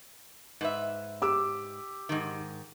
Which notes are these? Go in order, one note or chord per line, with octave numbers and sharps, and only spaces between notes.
G#2 B4 E5
G4 D6 E6
G#2 D#3